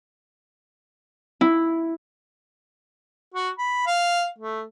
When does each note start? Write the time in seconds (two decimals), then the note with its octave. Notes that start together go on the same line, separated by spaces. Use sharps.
1.41 E4
3.34 F#4
3.58 B5
3.86 F5
4.38 A3